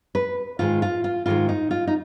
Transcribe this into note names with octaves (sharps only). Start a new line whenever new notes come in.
B4
G#2 D#3 G#3 F4
F4
F4
G#2 D#3 G#3 F4
D#4
F4
D#4